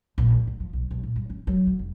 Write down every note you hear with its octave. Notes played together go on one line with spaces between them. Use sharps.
A#1
A2
D3
F3
B1
B1
A#2
G2
C#4
F#3
D3
F1